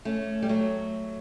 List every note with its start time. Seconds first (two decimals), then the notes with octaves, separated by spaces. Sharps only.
0.05 A3 C#4
0.42 G3
0.49 F#3 A3